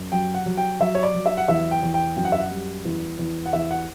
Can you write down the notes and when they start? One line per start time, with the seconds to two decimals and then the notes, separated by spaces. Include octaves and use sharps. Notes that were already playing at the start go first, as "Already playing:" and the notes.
Already playing: F#2
0.12 F#3 G5
0.34 F#5
0.46 F#3
0.57 G5
0.80 F#3 E5
0.95 C#5
1.03 D5
1.14 F#3
1.26 E5
1.37 F#5
1.48 E2 E5
1.71 G5
1.83 E2
1.94 G5
2.16 F#2 G5
2.25 F#5
2.32 E5
2.40 F#5
2.51 G3
2.85 E2
3.19 E2
3.46 F#5
3.53 E2 E5
3.70 F#5